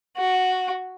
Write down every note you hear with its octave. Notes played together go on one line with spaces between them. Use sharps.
F#4